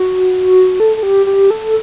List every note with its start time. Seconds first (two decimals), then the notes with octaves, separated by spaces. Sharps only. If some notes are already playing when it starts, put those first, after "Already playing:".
Already playing: F#4
0.80 A4
0.97 A4
1.03 G4
1.26 G4
1.50 A4